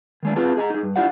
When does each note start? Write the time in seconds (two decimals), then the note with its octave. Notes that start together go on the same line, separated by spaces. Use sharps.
0.23 D#3 G#3 D4
0.36 C4 F4 G#4 B4 A5
0.57 G#4 D#5 A5 A#5
0.70 D#4 G#4
0.83 G2
0.96 D4 E4 F4 G4 D5 F#5